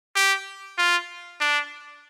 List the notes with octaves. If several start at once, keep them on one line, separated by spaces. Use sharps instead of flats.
G4
F4
D4